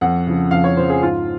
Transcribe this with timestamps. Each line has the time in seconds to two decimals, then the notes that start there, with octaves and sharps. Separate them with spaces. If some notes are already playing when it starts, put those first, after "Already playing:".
0.01 F2 F#5
0.27 C#3 F3
0.51 F2 F5
0.64 C#5
0.77 C#3 F3 C5
0.90 G#4
1.02 G#2 F4